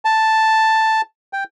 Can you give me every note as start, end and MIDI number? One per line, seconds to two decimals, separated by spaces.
0.05 1.01 81
1.33 1.44 79